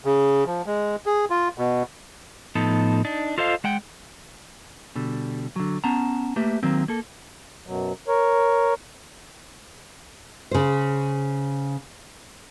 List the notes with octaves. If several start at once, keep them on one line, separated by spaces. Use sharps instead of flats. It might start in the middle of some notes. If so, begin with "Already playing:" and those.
C#3
F3
G#3
G#4
F4
B2
A2 F3 B3 D#4 A4
D4 D#4
F4 A4 C5 D#5 F5
G#3 F#5 G5
B2 D3 G3
D3 F#3
B3 C#4 A5 A#5
A3 A#3 G4 B4 E5
D#3 F#3 A#3 C4
A#3 A4
F#2 B2 F#3
A#4 C#5
C#3 C5